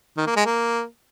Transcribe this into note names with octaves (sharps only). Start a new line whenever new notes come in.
D#3
A#3
G#3
A#3